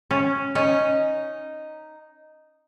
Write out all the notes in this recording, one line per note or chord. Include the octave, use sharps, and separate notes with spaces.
C#4
C#4 D#4